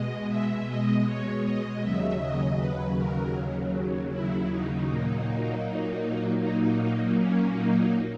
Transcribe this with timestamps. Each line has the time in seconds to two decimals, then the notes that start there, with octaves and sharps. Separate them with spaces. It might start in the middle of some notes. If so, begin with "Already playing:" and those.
Already playing: B2 G#3 D#5
0.29 E5
0.68 D#5
1.06 C#5
1.44 D#5
1.82 D#2 C#3 F#3 E5
2.20 D#5
2.58 B4
2.97 A#4
4.11 E4
4.50 D#4
4.88 A#2 F#3 A#3
6.41 D#4
7.18 C#4
7.56 D#4